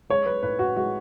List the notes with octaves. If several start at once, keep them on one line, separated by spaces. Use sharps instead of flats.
G#3 C#5
G#3 B4
A2 B4
A2 F#4
G#3 F#4